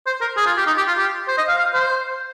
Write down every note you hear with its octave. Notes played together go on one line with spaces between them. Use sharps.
C5
A#4
G#4
F4
G4
D#4
G4
F4
G4
C5
D#5
F5
F5
C5